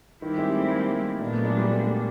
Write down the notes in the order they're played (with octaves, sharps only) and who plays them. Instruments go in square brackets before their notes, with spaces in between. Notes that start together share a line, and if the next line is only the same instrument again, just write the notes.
[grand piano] D#3 [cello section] G3 C4 E4 G4
[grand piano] G#3
A3
A#3
[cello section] A#2 F#3 B3 D4 [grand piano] A#3
[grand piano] A3
G#3
G3
A3
A3
A#3